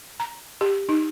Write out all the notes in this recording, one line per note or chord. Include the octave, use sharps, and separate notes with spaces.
A#5
G4
D#4